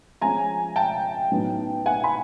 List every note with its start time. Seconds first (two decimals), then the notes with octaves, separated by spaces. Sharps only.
0.21 F3 G#3 C#4 G#5 A#5
0.76 G5 A5
1.32 A2 F#3 B3 D#4
1.86 F#5 G#5
2.04 B5